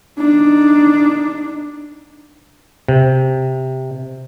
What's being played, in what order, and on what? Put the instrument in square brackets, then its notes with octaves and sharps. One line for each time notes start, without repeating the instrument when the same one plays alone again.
[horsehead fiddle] D4 D#4
[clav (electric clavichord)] C3